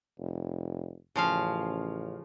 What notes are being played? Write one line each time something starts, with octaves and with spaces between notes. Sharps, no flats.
F1
A1 C#3 F3 F5